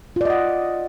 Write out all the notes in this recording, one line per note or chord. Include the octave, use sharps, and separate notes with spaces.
F4 D5 D#5 F#5